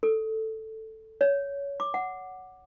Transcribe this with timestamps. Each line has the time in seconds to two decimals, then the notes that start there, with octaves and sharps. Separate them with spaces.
0.03 A4
1.21 C#5
1.80 D6
1.94 F#5